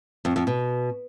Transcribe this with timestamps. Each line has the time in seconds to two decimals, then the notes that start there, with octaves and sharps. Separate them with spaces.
0.25 F2
0.36 F2
0.47 B2